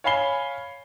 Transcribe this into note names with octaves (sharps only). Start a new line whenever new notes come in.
C#5 F5 G#5 B5 C7 G7